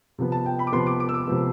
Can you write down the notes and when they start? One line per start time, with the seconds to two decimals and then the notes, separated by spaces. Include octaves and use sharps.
0.18 C3 F3 B3
0.32 A5
0.46 G5
0.59 B5
0.67 D6
0.72 C3 F3 B3 C6
0.87 D6
1.00 D6
1.09 E6
1.14 D6
1.28 C3 F3 B3